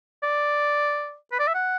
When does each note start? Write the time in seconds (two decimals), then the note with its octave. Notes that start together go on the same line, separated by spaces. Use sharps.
0.23 D5
1.32 B4
1.39 D5
1.47 E5
1.55 F#5